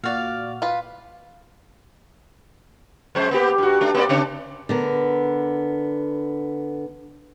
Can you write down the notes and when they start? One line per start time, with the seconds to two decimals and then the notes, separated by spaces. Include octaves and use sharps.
0.04 A#2 F#4 D5 F5 F6
0.62 F4 B4
3.15 F2 G#3 C5
3.31 A#3 B3 G4
3.58 G2 F#4
3.81 A3 D4
3.94 A#3 C4 D5
4.09 C#3 C4 D4
4.69 D3 B3 A#4